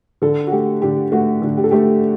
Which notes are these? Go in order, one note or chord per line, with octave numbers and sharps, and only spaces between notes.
D3 A4
F#4
A3 G4
D3 G4
A3 F#4
D3
G4
A4
A3 G4